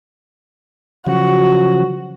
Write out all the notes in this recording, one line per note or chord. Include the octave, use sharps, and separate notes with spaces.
C#3 F3 F#3 F#4